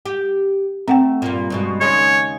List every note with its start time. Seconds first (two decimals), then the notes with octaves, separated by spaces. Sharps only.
0.06 G4
0.88 A3 C4 F#5 G5
1.22 G2 A#2
1.50 G2 B2 G#3
1.81 D#2 C#3 G#3 C#5